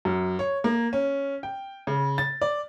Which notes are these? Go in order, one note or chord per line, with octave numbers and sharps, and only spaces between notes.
F#2
C#5
A#3
C#4
G5
C#3
A6
D5